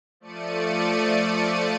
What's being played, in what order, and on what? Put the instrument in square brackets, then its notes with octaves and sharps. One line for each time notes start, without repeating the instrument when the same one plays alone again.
[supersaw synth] F3 A3 D5 C#7 D#7